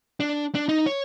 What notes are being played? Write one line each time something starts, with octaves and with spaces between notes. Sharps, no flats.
D4
D4
D#4
C#5